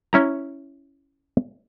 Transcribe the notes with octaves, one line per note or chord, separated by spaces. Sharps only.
C#4 E4 A#5